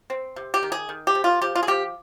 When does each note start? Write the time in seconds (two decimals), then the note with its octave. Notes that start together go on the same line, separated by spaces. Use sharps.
0.10 C4
0.36 C3
0.54 G4
0.63 D#3
0.72 G#4
0.89 D#3
1.07 G4
1.15 C3
1.24 F4
1.41 F3 G4
1.55 F4
1.63 G#4
1.67 F3 G4